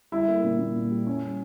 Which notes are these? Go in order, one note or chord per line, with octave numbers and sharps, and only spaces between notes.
G3 E4
A#3
A#2
A#2
A#2
G3
G3 C#4
G3